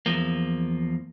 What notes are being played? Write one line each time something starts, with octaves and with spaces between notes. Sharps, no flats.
E2 G2 F3 A#3